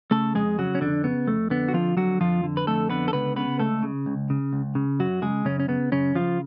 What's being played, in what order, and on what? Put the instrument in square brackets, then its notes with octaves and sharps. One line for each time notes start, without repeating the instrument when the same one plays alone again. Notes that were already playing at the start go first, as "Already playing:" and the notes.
[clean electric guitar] C#3 A3 A4
F2 G#3 G#4
C#3 F#3 F#4
C#4
F2 D3 D4
C#3 B3
F2 A3
D3 B3
F#4
F2 F3 F4
D3 F#3 F#4
F2 F3 F4
D3
B4
F2 A3 A4
D3 B3 B4
A4
C#2 B3 B4
C#3 B3 B4
C#2 A3 A4
C#3
C#2
C#3
C#2
C#3
F#2 F#3 F#4
C#3 G#3 G#4
F#2 C#3 C#4
C#4
C#3 B3
F#2 C#3 C#4
C#3 F3 F4